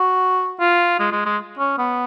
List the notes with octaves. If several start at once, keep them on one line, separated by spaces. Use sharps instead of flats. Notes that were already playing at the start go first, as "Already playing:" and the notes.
Already playing: F#4
F4
G#3
G#3
G#3
C#4
B3